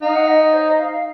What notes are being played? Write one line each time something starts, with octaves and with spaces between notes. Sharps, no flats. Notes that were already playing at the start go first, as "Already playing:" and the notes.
D#4 F5
F#5
D#5
D#5
C5
D#5
F5
F5